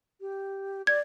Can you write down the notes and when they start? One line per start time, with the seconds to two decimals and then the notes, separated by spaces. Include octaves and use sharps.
0.21 G4
0.87 D5 G#6